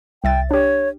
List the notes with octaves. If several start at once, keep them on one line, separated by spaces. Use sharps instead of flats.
C2 E5 G5 A6
D4 G4 C#5